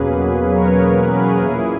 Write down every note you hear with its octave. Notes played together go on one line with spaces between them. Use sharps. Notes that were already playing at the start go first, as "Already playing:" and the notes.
Already playing: E2 B2 F#3 A#3 C#4 G#4 B4
A#4 C#5
B4
A#4
G#4 B4
A#2 A#3 C#4 E4 G#4